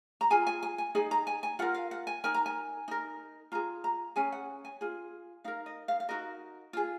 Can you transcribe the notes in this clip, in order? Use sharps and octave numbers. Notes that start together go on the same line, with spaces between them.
A#5
F4 G#4 G#5
G#5
G#5
G#5
D#4 G#4 G#5
A#5
G#5
G#5
F4 A#4 F#5
F5
F#5
G#5
D#4 A#4 G#5
A#5
G#5
D#4 A#4
F4 G#4 A#5
A#5
C#4 G#4 G#5
F#5
G#5
F4 G#4
D#4 A#4 F5
D#5
F5
F5
D#4 F#4 A#4 D#5
F4 G#4